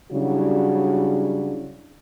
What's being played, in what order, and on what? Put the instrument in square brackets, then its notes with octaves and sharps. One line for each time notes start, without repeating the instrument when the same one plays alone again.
[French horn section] C#3 F#3 G3 D4 E4 F#4